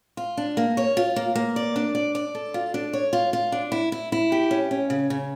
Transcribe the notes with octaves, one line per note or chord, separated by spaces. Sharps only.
F4
D4
A#3
C#5
F4
A#3
A#3
D5
D4
D5
D5
A4
F4
D4
C#5
F4
F4
D4
E4
E4
E4
G4
C#4
C#4
C#3
C#3